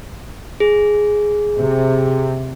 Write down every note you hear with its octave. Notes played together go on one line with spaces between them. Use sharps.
G#4
C3